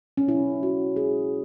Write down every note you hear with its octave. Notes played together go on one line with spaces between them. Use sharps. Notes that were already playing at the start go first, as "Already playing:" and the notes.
C#4
B2 F#3 E4
F#4
G#4